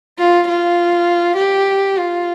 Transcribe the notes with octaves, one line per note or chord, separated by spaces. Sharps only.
F4
F4
G4
F4